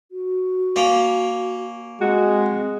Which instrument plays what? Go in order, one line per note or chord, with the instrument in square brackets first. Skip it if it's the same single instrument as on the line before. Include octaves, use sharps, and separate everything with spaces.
[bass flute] F#4
[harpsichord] A#3 C#4
[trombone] G#3 [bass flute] C4 [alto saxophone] F#4